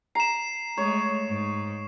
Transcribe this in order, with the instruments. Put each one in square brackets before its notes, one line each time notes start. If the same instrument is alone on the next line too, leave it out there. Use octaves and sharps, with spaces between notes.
[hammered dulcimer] A#5 [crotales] C7 E7
[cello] G#3 A3 [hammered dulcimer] C#5
[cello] G#2